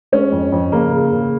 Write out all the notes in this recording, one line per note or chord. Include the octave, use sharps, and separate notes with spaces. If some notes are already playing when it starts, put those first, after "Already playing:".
G#3 C#4
F2
F2
C#3 A#3
C#3
C#3